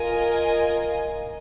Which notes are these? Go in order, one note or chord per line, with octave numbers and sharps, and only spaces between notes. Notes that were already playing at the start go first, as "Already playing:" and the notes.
Already playing: F4 A#4 D#5 G#5